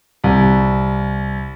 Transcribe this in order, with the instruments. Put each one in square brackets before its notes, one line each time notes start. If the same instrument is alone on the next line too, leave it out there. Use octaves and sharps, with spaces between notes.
[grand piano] C2